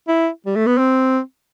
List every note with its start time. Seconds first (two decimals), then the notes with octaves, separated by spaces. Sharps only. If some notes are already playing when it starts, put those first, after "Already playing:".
0.08 E4
0.46 G3
0.56 A3
0.66 B3
0.78 C4